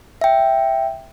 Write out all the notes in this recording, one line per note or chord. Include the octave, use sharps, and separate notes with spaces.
E5 G5